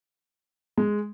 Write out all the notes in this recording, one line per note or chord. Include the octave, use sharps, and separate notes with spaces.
G#3